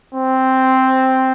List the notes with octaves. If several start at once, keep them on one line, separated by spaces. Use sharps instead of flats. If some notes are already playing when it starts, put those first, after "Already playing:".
C4